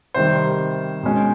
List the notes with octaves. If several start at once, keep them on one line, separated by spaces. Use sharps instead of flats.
C3 D#3 G3 C5
B2 G#3 C#4